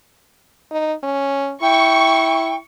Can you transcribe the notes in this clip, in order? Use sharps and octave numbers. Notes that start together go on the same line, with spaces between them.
D#4
C#4
E4 G5 C#6